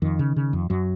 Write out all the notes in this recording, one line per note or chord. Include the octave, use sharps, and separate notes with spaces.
F2 D#3
C#3
C#3
F2
F#2 F#3